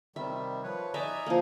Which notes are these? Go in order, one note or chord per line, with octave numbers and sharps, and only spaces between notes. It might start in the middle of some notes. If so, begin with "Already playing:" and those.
C3 D#3 G3 E5
F3 B4 C#5
D#4 D5 E5 G#5 A#5
F3 A#3